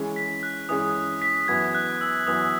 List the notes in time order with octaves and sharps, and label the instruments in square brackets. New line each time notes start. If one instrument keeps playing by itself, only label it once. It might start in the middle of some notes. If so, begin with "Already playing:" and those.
Already playing: [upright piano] E3 G#3 C#4 G#4
[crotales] B6
F#6
[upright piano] E3 G#3 C#4 G#4 [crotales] D#6
[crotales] B6
[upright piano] F#2 E3 B3 F#4 [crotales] G#6
[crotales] F#6
E6
[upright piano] F#2 E3 B3 F#4 [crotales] D#6